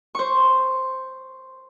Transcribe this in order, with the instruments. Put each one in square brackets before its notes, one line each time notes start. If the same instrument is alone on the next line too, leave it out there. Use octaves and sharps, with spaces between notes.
[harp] C5 C#6